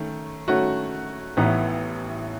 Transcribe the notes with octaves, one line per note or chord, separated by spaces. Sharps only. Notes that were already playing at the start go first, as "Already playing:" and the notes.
Already playing: D#3 A3 C#4
D#3 A3 C#4 F#4
A1 A2 E3 B3 D#4